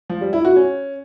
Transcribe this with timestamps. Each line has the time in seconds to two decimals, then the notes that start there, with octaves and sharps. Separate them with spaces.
0.09 F3
0.21 G3
0.33 E4
0.45 F#4
0.56 C#4